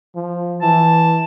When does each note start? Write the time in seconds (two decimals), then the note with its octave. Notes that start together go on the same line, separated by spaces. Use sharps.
0.16 F3
0.62 E3 A5